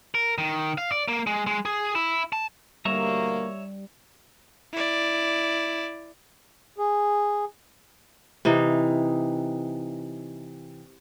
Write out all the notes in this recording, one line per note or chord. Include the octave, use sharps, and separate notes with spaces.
A#4
D#3
F5
D5
A#3
G#3
G#3
G#4
E4
A5
D2 B2 G3 A#3 C#5 E5 A#5
E4 D5
G#4
C3 E3 D#4